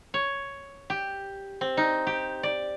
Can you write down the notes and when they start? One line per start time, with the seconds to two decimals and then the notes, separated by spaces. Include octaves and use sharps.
0.14 C#5
0.90 G4
1.61 C4
1.77 D#4
2.07 G4
2.43 D5